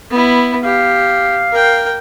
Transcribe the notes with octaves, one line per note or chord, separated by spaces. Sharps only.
B3 E4
G4 F5
A#4 G5